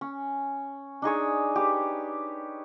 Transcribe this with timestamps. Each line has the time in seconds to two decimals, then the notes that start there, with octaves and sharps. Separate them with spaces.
0.01 C#4
1.02 D4 D#4 G#4 C#5
1.56 G4 B4